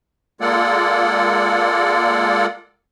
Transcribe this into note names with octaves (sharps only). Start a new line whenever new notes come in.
G#3 A#3 F4 A4 D5 F#5